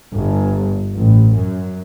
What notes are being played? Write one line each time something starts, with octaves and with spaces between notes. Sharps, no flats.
G1
A1
F#2